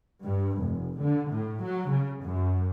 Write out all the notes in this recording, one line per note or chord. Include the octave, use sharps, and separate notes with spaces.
G2
F1
D3
A2
F#3
C#3
F#2